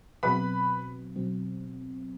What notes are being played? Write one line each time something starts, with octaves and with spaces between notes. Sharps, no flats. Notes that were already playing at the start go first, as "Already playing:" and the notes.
B2 F#3 C4 B4 B5
B2 F#3 C4